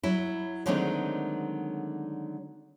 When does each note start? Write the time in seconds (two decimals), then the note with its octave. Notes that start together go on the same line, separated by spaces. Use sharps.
0.03 F#3 E4
0.66 D3 D#3 F#3 G#3 A3 C4